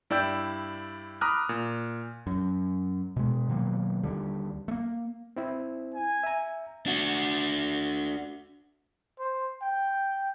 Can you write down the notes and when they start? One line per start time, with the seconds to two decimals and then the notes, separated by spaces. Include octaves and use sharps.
0.10 G2 E4 D5 G5 E6 G6
1.21 A#5 B5 D6 D#6 F6 F#6
1.49 A#2
2.27 F#2
3.16 B2 G#3
3.48 B2 D#3 F#3 A#3
4.03 D#2 D3 G3
4.68 A3 A#3
5.36 C4 E4 C5
5.94 G#5
6.23 E5 A#5
6.86 D4 F#4
9.19 C5
9.62 G5